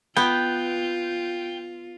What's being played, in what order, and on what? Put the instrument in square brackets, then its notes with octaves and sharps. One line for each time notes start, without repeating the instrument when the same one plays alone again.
[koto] B3 [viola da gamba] F4 [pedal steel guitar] G5